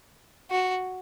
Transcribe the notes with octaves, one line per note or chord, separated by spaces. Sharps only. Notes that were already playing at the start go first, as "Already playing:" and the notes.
F#4